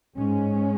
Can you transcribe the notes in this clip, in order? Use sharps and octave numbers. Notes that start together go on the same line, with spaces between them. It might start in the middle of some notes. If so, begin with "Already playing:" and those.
G#2 G#3 C#4